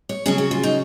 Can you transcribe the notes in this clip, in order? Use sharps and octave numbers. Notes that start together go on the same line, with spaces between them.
C#5
C#3 F#3 C#4 G#4
F#4
F4
D#4